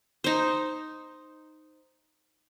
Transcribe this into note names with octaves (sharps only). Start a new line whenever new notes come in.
D#4 C5